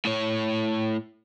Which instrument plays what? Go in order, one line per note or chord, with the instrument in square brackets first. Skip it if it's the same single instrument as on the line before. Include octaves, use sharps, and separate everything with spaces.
[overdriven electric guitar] A2 C#5